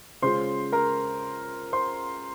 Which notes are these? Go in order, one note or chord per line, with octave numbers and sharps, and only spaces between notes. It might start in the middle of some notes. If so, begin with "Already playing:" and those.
C#3 G#3 C#4 F4 C5 C6
A#4 A#5
C5 C6